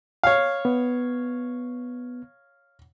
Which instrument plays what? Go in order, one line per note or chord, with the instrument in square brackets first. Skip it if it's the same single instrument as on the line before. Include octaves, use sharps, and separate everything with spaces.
[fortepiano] C#5 F5
[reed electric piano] B3